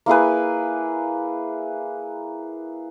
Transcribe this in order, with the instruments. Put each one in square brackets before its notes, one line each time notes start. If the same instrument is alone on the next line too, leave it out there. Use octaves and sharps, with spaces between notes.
[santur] A#3 E4 G#4 B4